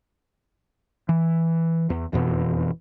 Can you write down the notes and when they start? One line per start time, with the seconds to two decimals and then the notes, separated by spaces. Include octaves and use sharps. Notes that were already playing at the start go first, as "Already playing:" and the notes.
1.09 E3
1.90 E2
2.13 E1 F2 B2 E3